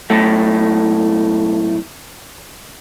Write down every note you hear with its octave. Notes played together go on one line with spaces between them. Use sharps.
B1 A2 A3